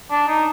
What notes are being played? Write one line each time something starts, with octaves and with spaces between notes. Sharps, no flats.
D4
D#4